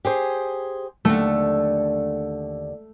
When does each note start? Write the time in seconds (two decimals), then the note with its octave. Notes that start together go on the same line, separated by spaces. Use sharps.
0.05 G4 G#4 C5
1.05 D#2 D3 A3